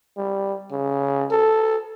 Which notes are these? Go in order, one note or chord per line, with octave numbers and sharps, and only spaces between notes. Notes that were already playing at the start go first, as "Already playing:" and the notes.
G3
C#3
A4